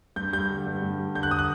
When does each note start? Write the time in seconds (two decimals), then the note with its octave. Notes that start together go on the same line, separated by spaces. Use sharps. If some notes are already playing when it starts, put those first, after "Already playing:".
0.16 G2 G6
0.33 G3 G6
0.50 D3
0.67 G2
0.82 G2
0.99 G3
1.15 D3 G6
1.23 F#6
1.31 D#6
1.39 F#6